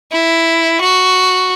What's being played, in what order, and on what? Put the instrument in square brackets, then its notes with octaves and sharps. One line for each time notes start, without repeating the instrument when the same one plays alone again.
[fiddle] E4
F#4